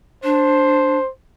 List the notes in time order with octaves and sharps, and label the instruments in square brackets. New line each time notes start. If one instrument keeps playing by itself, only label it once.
[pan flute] D4 [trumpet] C5